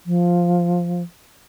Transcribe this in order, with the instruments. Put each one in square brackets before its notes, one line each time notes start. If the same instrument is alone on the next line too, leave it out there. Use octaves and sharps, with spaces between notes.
[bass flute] F3